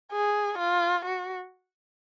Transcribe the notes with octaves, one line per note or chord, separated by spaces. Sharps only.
G#4
F4
F#4